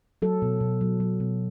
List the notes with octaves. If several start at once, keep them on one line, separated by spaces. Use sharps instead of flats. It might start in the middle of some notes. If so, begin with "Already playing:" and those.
F#3 A4
B2
B2
F#3
F#3
B2